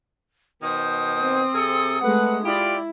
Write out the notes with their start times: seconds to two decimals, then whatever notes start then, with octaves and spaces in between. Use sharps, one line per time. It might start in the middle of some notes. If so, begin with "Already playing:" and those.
0.63 B2 D#3 C5 D#6
1.19 C4
1.54 C3 G#4 A4
2.01 G#3 A3 B4 F#5
2.44 E4 F4 G4 D5